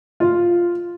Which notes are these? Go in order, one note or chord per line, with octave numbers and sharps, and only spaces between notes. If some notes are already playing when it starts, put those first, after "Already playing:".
F4